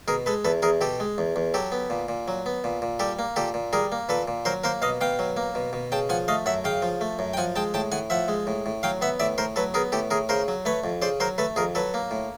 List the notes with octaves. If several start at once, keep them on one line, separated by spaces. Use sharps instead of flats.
B2 G#4 A#4
G#3 A4 B4
E2 A4 B4
E2 G#4 A#4
B2 G4 A4
G#3
E2
E2
F#3 G4 A4
B3
A#2
A#2
F#3
B3
A#2
A#2
G3 G4 A4
A#3
A#2 G4 A4
A#2
G3 G#4 A#4
A#3
A#2 A4 B4
A#2
F#3 A#4 C5
A#3 A#4 C5
B2 D#5 F5
B2 F5 G5
F#3
A#3
B2
B2
C#3 G5 A5
F3 F#5 G#5
A3 D#5 F5
F#2 E5 F#5
C#3 F5 G5
F3
A3
F#2
G5
F3 F#5 G#5
G#3 G5 A5
A2 G5 A5
A2 F#5 G#5
F3 E5 F#5
G#3
A2
A2
F#3 F5 G5
B3 E5 F#5
A2 D5 E5
A2 A#4 C5
F#3 A4 B4
B3 G#4 A#4
A2 G4 A4
A2 G#4 A#4
C#3 A#4 C5
F#3
A3 B4 C#5
F2
C#3 C5 D5
F#3 A#4 C5
A3 A4 B4
F2 G#4 A#4
F#3 A4 B4
A#3
A2